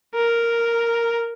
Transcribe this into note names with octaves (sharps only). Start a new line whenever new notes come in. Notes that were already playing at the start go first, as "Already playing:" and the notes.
A#4